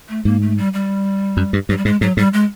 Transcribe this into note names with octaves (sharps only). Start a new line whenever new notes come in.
A3
G#2 A#3
A3
G3
G3
F#2
G2
G2 F#3
G3
G#2 G#3
G#2 F#3
G#2 G3
G#3